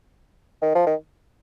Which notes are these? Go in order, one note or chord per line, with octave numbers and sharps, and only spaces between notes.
D#3
F3
D#3